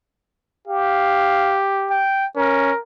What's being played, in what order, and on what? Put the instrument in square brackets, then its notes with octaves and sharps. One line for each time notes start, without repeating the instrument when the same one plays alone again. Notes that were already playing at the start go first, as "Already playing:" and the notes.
[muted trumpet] G4 [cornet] F5
[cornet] G5
[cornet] C#4 [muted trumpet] A#4